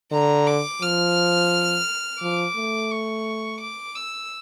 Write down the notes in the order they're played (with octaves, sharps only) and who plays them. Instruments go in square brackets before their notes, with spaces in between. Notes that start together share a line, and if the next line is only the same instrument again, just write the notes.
[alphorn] D3 [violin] A#5
[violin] D6
[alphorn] F3 [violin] F6
[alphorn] F3 [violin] D6
[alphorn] A3
[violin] C#6
D6
E6